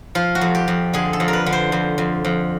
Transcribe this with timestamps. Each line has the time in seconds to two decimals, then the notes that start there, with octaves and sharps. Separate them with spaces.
0.15 F3 F4
0.35 F#4
0.41 F2
0.55 G4
0.68 F2
0.93 D3 G#4
1.13 A4
1.20 F2
1.28 A#4
1.33 B4
1.46 D3
1.53 C5
1.72 F2
1.98 F2
2.25 F2